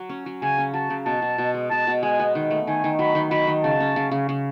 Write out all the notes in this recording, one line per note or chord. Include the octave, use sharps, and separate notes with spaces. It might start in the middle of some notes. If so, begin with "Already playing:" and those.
Already playing: F#3
C#4
F#3
C#3 G#5
C#4
F#3 A5
C#3
B2 A5
B2
B2
G#3
B2 A5
B2
G#3 G#5
B3
D#3
A3
D#3 G#5
D#3
F#3 B5
D#3
F#3 B5
D#3
C#3 A5
C#4
C#3
C#3
C#3